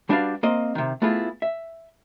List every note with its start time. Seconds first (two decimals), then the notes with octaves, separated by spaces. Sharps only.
0.09 G3 D4 E4 F#4 B4 F5
0.43 A#3 C4 D#5
0.75 C3 D#3
1.02 A3 B3 E4 F4 G#4
1.42 E5